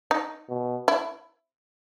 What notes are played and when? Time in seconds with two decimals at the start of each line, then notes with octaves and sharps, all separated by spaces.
0.11 D#4
0.49 B2
0.88 E4